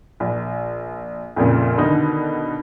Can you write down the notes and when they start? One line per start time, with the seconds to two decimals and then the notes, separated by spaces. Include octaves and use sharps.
0.20 A#1
1.36 A#1 F2 A#2 C#3
1.78 B2 D3 D#3 D#4